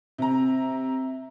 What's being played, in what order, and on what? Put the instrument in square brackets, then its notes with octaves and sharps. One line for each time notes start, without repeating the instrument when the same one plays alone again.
[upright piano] C3 A#5